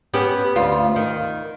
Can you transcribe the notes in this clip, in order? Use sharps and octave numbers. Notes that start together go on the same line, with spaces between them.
B3 C#4 G4
D2 F4
D#3